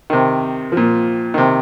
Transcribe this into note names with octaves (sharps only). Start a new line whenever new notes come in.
C3 D#3
A#2 F3
C3 D#3